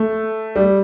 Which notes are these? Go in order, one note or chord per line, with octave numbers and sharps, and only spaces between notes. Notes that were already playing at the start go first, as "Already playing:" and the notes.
Already playing: A3
G3